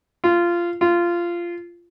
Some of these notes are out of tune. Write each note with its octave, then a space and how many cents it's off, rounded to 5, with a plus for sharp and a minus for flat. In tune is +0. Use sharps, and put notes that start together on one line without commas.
F4 -15
F4 -15